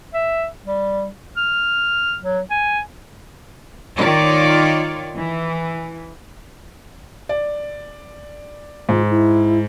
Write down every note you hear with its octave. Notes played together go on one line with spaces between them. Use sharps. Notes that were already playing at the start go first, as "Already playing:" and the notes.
E5
G3
F6
F#3
G#5
D#3 F4 C#5 D5
E3
D5
G#2 F4
E4